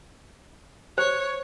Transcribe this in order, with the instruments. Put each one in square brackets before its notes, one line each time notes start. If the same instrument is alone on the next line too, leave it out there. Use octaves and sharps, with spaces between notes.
[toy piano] C5 [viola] C#5